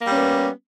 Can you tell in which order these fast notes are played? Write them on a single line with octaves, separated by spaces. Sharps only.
A#3 G3 C#4 B3